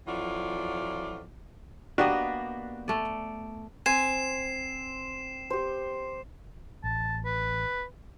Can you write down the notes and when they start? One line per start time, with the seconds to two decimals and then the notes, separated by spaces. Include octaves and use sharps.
0.07 F2 E3 F#3 F4 F#4 D5
1.98 A#3 B3 D4 F#4 G4 D#5
2.88 A3 D5
3.86 C4 G#5 C7 E7
5.50 G4 C5
6.84 A1 A5
7.25 B4